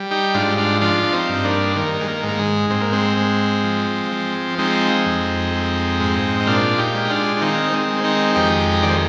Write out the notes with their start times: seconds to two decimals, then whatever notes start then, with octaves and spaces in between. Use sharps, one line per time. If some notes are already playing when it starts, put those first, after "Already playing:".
Already playing: G3
0.11 D#4 G4
0.34 G#2 D4 F4
0.58 D4 F4
0.81 F3 D4 F4
1.03 D4
1.13 C4 D#4
1.29 G2
1.44 A#3 D4
1.76 D#3 A#3
2.01 G#3
2.07 A#3
2.23 G#2
2.29 A#3
2.39 G#3
2.70 G#2 C4
2.81 A#3
2.93 G#3 C4
3.17 G#3
3.64 F3
4.12 F3
4.58 G#3 C4 D#4
5.06 F2
5.53 G#3
6.00 G#2
6.40 D#4
6.47 A#2 D4 F4
6.78 D#4 G4
6.94 G#3
7.10 D4 F4
7.37 D4
7.41 D#3 C4 D#4
7.72 G#3 C4
7.88 G#3
8.04 C4 D#4
8.35 F2 D#4 G4
8.83 D#3 D5
8.90 C5